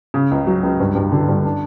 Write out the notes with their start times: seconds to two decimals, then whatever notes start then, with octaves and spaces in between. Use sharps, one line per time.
0.14 C#3
0.31 C#2
0.47 F#3
0.63 C#2
0.80 G2
0.95 G2
1.12 D3
1.28 G2
1.45 D4